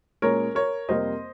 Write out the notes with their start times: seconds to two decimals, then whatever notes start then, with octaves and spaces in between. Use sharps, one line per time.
0.22 A#2 G#3 C#4 A#4 C#5
0.55 A#4 C#5
0.89 F2 C3 G3 A#3 C5 D#5